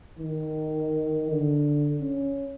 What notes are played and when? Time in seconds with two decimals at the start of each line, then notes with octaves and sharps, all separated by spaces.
0.19 D#3
1.31 D3
2.01 C#4